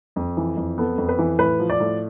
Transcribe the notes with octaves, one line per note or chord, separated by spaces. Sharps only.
F2
E3
F2
B3 A4
F2
B4
E3
A2 B4
F3
D5
A2